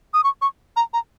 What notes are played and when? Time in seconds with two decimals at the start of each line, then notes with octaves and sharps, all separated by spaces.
0.14 D#6
0.24 C#6
0.42 C#6
0.76 A#5
0.93 A#5